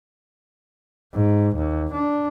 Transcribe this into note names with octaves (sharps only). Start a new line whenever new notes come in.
G#2
D#2
D4